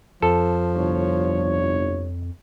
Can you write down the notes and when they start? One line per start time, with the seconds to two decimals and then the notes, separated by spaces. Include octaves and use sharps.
0.22 F2 F3 A4
0.75 G1 C2 C#5